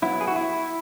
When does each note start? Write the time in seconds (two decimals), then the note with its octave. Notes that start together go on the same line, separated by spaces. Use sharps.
0.02 F#3 B3 E4
0.21 G#4
0.28 F#4
0.36 E4